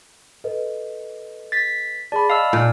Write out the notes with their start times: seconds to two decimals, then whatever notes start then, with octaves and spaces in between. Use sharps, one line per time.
0.44 A4 B4 D#5
1.52 A6 B6
2.12 G#4 D5 A5 B5
2.30 D#5 F5 A5 E6 F7
2.53 A#2